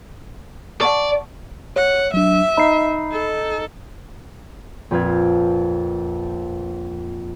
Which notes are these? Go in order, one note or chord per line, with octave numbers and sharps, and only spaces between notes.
D5 F#5 A5 C#6
C#5 F#5
F#3 D4 E5
D#4 B5 C7
A4
A#1 F2 B4 F5 G#6